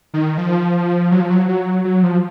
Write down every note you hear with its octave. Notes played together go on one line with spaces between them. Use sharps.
D#3
F3
F#3
F3
F#3
F#3
F#3
F3